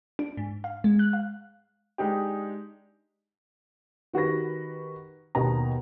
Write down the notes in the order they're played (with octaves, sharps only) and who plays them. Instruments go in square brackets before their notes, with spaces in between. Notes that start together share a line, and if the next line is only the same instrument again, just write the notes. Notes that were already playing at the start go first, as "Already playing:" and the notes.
[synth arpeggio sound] D4
G#2
F5
G#3
F#6
F5
[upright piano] G#3 D4 D#4 G4
[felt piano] D#3 F#4 G4 B4 A#6
D#2 B2 B3 A#5